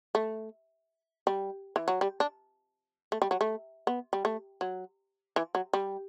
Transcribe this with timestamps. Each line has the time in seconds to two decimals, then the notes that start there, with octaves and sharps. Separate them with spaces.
0.15 A3
1.27 G3
1.76 E3
1.88 F#3
2.01 G3
2.20 D4
3.12 A3
3.22 G3
3.31 F#3
3.41 A3
3.87 B3
4.13 G3
4.25 A3
4.61 F#3
5.36 E3
5.55 F#3
5.73 G3